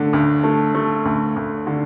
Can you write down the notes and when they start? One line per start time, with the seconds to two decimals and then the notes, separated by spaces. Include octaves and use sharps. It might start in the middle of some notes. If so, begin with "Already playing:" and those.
Already playing: D3 A3
0.13 D2
0.43 A3
0.75 A3
1.05 D2
1.36 D2
1.67 D3